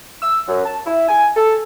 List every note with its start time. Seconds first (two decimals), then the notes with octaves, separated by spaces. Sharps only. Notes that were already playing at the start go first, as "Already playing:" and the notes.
0.23 E6
0.48 F#2
0.66 A5
0.86 E4
1.09 G#5
1.37 A4